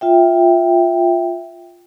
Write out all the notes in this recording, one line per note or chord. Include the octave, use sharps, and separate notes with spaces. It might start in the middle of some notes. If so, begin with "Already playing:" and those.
F4 E5 G5